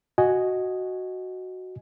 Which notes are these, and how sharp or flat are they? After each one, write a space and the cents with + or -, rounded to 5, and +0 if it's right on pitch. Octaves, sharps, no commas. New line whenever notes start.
F#4 +0 D#5 +0 G#5 +0